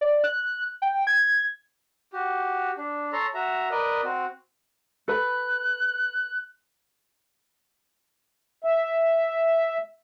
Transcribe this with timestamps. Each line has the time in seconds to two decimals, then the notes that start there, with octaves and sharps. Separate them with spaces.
0.01 D5
0.24 F#6
0.82 G5
1.07 G#6
2.13 F#4 G4
2.78 D4
3.13 A4 C#5 A5 A#5 C6
3.34 F#4 E5 A#5
3.71 A#4 B4 D5 D#5
4.04 C4 F#4
5.08 A4 B4 B5 F#6
8.64 E5